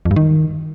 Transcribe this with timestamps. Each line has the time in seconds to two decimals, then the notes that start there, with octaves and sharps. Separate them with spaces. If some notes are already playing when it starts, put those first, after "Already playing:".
0.05 F2
0.11 G2
0.16 D#3